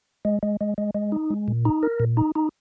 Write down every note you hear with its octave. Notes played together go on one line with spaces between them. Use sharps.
G#3
G#3
G#3
G#3
G#3
D#4
G#3
A#2
D#4
A#4
A#2
D#4
D#4